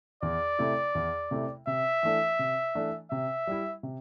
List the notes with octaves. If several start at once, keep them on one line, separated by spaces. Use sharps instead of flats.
E2 D5
C3 A3 E4
E2
C3 A3 E4
C3 E5
E3 A3 D4
C3
E3 A3 D4
C3 E5
G3 E4
C3